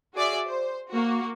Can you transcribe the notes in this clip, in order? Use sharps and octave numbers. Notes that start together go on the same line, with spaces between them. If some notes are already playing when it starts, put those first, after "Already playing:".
F#4 G#4 D5 E5
C5
A#3 F#4